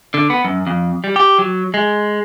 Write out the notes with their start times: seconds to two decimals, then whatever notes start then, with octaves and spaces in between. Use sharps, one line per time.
0.14 D3
0.30 B3
0.44 F#2
0.67 F2
1.04 G3
1.16 G4
1.39 F#3
1.74 G#3